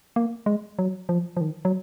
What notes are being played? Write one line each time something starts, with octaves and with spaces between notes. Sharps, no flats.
A#3
G#3
F#3
F3
F3
D#3
F#3